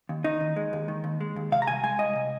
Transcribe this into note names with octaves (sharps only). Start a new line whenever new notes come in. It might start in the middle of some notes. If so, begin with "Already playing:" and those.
D#2
D#3 D#4
D#2
G#3
D#2
D#3
D#2
G#3
D#2
C3 F5
A#5
C2 G#5
G#3 G#5
C2 D#5
C3